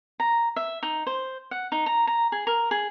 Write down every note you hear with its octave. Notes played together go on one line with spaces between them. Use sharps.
A#5
E5
D#4
C5
F#5
D#4
A#5
A#5
G#4
A#4
G#4